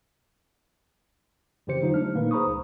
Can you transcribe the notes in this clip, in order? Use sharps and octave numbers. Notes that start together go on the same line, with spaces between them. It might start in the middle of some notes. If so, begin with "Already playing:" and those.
F2 C#3 E3 G4 C5 C#7
D3 F#3 D#4 F4 C5
A3 D4 F6
A#2 D#3 A#3 D#4 B4
G#4 C5 A#5 B5 C#6 D#6
C#2